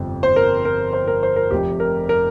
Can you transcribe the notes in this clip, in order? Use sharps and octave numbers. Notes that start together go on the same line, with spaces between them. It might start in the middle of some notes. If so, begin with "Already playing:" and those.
Already playing: G1 F2 C3 G3
C5
A#4
A#4
C5
A#4
C5
A#4
F1 F2 C3 G4
A#4
A#4